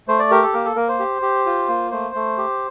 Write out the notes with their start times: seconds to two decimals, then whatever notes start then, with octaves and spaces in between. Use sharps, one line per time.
0.08 A3 C5
0.19 D5
0.31 G4 A#4
0.42 A4
0.53 A#3 A#4
0.65 A4
0.76 A#3 A#4
0.89 C5
0.99 G4
1.22 G4
1.46 F4
1.68 A#3
1.91 A3 C5
2.15 A3
2.38 G4